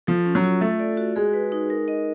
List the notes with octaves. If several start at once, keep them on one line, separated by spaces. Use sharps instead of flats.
F3 A4
C#4
F#3
F4
A3 A4
D5
F#4
G#3 G#4
B4
D#4
A#4
D#5